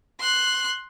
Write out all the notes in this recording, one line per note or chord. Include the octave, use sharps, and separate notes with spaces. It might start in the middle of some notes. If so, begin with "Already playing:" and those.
C6 F#6